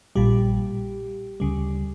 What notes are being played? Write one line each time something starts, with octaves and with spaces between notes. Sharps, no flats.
A#1 A#2 G3 G4
D2 C#3 G3